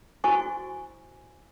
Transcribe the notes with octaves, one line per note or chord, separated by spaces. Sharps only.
E4 F#4 C5 G#5 C#6